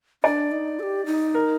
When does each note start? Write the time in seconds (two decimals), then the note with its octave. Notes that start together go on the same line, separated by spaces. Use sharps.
0.24 D4 D5
0.52 D#4
0.79 A4
0.83 G4
1.06 D#4
1.34 A#4